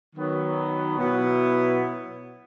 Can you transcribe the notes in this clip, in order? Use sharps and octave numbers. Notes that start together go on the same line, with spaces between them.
D#3 F#3 B3
B2 F#3 B3 E4